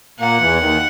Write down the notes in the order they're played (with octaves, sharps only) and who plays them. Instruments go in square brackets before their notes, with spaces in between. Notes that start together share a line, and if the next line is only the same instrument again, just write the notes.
[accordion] A#2 A#3 [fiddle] F#5
[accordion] E2 E3
D#2 D#3